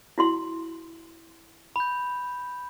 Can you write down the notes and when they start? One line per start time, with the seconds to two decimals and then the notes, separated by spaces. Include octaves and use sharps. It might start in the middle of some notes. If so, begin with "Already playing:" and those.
0.18 E4 F#4 C6
1.76 B5 G6